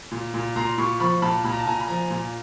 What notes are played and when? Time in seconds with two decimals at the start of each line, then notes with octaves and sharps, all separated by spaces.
0.11 A#2
0.34 A#2
0.56 A#2 A#5 C6
0.78 A#2 B5 C#6
1.00 F3 B5 C#6
1.22 A#2 A5 B5
1.44 A#2 B5
1.52 A#5
1.59 A5
1.66 A#2 G#5 A#5
1.80 B5
1.88 F3 G#5 A#5
2.10 A#2